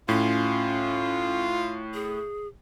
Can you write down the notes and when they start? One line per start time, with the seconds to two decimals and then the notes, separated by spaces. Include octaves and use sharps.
0.09 A2 C#4 F4
1.94 G#4